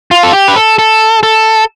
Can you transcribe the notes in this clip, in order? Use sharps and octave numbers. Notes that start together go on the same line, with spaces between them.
F4
A4
G4
B4
A4
A4
A4